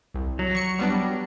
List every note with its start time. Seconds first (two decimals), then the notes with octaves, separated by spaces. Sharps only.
0.14 C2
0.39 F#3
0.55 C#6 C#7
0.79 G3 B3 D4